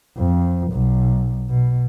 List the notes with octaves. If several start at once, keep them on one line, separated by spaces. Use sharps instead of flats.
F2
B1
B2